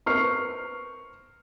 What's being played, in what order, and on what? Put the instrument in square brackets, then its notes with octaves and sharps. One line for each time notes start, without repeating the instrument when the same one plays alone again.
[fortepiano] C4 A#4 B4 [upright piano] C#6 F6 C7